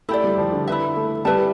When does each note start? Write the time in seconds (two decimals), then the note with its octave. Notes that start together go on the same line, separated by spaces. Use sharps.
0.09 A3 E4 G4 D5
0.24 G3
0.38 F3
0.52 D3
0.67 E4 B4 E5
0.97 A3
1.25 G3 E4 B4 E5 A5